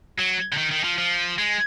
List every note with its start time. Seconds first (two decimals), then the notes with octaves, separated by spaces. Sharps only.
0.18 F#3
0.52 D3
0.57 D#3
0.71 D#3
0.84 F3
0.98 F3
1.38 G#3